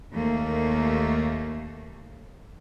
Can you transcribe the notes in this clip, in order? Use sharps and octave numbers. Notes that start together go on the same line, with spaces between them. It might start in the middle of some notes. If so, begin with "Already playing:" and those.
D#2 A3 A#3